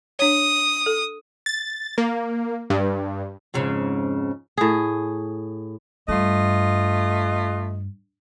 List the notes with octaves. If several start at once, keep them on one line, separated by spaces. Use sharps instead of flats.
D4 C#5 D#6
A4
A6
A#3
G2
F2 G#2 C#3
A2 G#4
G2 A3 F4 D#5